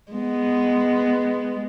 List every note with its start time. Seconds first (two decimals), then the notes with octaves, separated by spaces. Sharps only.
0.12 G#3 B3